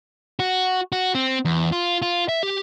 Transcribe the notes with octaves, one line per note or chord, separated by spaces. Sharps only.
F#4
F#4
C4
E2
F4
F4
E5
G4